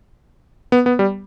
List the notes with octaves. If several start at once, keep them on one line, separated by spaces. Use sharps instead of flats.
B3
B3
G3